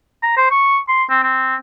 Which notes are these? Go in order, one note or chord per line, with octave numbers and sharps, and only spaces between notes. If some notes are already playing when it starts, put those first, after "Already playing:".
A#5
C5
C#6
C6
C4
C4